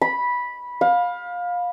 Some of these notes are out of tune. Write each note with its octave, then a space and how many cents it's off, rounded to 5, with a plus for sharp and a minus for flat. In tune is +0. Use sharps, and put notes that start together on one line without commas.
B5 -10
F5 +25